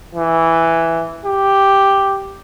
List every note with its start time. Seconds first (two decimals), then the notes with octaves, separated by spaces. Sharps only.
0.15 E3
1.25 G4